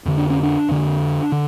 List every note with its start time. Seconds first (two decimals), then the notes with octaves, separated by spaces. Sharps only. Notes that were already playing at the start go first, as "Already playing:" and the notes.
0.05 F2 D3
0.18 D4
0.30 C#4
0.43 D4
0.68 F2 D3
1.32 D3